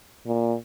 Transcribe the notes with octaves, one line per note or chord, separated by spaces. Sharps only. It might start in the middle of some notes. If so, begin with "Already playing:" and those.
A#2